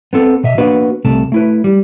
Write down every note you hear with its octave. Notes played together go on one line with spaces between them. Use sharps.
B3 C4 A4
B2 D#5 E5
A#3 B3 D4 F#4 B4
C2 C3 A3 A5
A3 E4 B4
G3